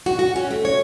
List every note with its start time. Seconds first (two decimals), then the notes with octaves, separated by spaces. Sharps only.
0.06 F#4
0.19 F#4
0.36 C#4
0.51 A3
0.65 C#5